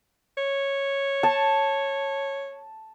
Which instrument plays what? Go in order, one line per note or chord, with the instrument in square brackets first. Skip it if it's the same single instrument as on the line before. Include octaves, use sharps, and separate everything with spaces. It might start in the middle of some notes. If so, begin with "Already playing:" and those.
[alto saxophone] C#5
[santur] A5